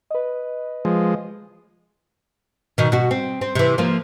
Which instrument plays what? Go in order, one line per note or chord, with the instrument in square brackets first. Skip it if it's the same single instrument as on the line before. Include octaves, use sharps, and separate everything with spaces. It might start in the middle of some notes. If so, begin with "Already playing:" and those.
[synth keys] B4 D#5
[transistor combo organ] F3 G#3
[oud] B2 D#3
B2 F#4
C4
C4
C3 E3
F3 A#3